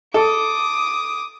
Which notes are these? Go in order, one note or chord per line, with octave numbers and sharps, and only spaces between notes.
A4 D6 D#6